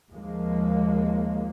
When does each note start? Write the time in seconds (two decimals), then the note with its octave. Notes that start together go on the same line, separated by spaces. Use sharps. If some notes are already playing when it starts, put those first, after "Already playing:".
0.11 D#2 F3 G#3 A#3